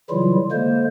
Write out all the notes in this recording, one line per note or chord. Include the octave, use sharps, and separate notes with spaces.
C#3 E3 F#3 G3 E4 F4
D3 G#3 A#3 C5